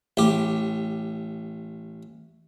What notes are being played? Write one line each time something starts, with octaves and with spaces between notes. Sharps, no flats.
A1 G4